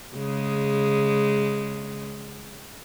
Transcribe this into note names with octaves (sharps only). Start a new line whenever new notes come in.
C#3 G#3